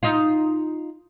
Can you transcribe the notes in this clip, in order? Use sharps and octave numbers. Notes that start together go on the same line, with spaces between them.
D#4 F4